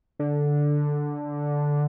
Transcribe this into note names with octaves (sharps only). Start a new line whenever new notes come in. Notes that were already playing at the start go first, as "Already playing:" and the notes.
D3